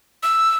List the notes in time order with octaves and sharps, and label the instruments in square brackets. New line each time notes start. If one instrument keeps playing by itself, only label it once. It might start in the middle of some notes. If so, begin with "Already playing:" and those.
[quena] E6